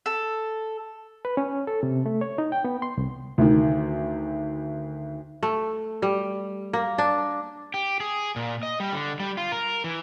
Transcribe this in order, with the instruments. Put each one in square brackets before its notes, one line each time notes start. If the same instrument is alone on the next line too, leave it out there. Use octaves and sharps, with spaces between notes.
[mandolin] A4
[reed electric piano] B4
C#4
A4
C3
A3
C#5
D#4
G5
B3
C6
C2
[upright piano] D2 D#3
[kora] A3
G3
A#3
D4
[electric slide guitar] G4
G#4
A#2
D#5
G3
D3
G3
F4
A#4
E3